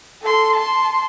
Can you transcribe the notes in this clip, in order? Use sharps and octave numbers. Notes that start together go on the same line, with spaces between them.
A4 C6
A5 C6